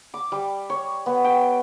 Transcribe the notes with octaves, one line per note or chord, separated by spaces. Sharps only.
D6
G3
C#5
B3
G5